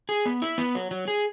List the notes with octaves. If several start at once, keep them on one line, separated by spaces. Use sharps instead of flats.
G#4
B3
E4
B3
F#3
F#3
G#4